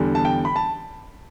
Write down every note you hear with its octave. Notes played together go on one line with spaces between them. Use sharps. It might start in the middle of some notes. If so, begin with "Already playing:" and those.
Already playing: E2 D3 G3
A5
G5
B5
A5